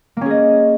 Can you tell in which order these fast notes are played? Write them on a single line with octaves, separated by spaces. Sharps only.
A#3 C#4 G#4 D#5